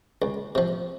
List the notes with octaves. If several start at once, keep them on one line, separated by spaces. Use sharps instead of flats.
C#2
C3 F3